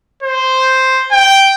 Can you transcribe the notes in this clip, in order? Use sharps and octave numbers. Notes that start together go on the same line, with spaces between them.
C5
G5